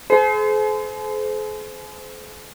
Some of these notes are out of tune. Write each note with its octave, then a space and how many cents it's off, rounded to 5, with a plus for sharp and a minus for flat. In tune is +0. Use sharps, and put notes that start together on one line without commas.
G#4 +45 C5 -30